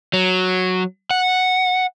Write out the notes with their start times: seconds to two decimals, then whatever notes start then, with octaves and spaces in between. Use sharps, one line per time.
0.13 F#3
1.11 F#5